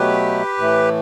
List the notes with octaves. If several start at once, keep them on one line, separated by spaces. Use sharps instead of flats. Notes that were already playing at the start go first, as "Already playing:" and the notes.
Already playing: B2 F#3 A3 G4 B4
A2 E3 A3